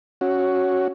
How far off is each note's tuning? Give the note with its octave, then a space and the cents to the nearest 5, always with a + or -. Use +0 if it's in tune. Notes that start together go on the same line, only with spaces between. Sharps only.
C#4 +0 F#4 +0